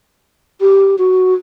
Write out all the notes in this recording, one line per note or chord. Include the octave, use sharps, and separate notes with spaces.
G4
F#4